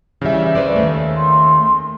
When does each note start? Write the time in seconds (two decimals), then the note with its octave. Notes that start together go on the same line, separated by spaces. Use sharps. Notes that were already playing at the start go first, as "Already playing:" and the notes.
0.22 C#3 E3 G3 E5
0.55 B4 C5 D5
0.76 D#2 A#2 A3
1.17 C6